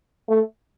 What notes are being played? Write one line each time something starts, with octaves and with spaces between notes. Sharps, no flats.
A3